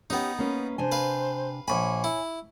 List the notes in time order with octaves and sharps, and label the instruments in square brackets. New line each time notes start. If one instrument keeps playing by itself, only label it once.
[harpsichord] B3 D#4 [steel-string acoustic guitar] C#4 G4
[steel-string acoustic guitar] A#3 C#4 B4
[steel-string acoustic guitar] C3 D4 G#5 [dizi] C5
[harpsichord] B4 F5
[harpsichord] A#1 B5 [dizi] C#5 [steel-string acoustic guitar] G#5
[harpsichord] E4